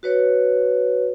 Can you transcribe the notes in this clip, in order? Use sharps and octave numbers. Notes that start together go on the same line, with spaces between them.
F#4 B4 C#5